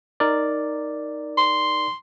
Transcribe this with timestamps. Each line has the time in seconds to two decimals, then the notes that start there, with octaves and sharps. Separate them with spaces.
0.20 D#4 A#4 D5
1.37 C6